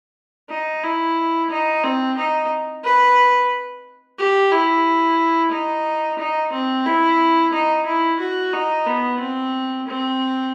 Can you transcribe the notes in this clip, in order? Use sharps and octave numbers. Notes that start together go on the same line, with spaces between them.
D#4
E4
D#4
C4
D#4
B4
G4
E4
D#4
D#4
C4
E4
D#4
E4
F#4
D#4
B3
C4
C4